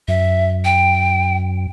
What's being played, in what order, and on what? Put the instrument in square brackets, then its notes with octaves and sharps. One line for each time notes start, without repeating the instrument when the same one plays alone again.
[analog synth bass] F#2 [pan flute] E5
[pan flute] G5